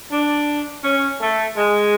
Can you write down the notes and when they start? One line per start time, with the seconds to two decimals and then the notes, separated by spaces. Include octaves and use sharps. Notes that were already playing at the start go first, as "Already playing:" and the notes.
0.11 D4
0.83 C#4
1.20 A3
1.56 G#3